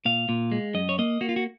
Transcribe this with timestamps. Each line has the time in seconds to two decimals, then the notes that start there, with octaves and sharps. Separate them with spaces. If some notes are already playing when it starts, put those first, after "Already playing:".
0.05 A#2 F5
0.29 A#2
0.52 G#3
0.75 F#2 D#5
0.89 C#5
0.99 A#3 D#5
1.21 A#3 F#4
1.29 F4
1.36 F#4